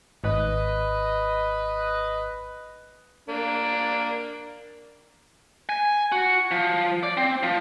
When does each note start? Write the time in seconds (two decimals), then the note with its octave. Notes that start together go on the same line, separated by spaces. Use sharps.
0.24 G#1 B4 D#5
3.29 A#3 D4
5.69 G#5
6.12 F#4
6.51 F3
7.03 D5
7.17 C4
7.43 F3